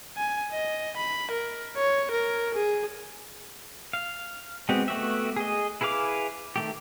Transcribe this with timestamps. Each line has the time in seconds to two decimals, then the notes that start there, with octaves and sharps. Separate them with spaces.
0.17 G#5
0.52 D#5
0.97 B5
1.31 A#4
1.77 C#5
2.12 A#4
2.55 G#4
3.93 F5
4.69 G#3 B3 C4 F#4 G4
4.88 A3 B3 F#4 G4 E5
5.36 G#4 D#5
5.81 E4 G#4 B4 F5 D6
6.56 D#3 A3 G4